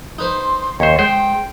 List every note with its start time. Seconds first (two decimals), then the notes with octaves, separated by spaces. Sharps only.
0.18 D#4 B4 C5 C6
0.80 D#2 C5 C#5
0.99 G#3 C5 G5